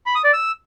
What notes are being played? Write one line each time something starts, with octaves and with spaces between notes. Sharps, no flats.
B5
D#6
D5
E6